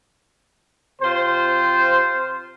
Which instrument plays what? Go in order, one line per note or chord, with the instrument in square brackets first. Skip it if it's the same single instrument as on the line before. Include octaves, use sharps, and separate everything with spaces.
[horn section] C3 F4 C5